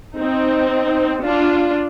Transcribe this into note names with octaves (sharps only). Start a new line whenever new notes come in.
C4 D#4
D4 F4